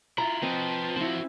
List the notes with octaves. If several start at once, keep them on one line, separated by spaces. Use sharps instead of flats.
E4 F4 A#5
F3 C4 B4 D#5
C4 E4 F#4 C5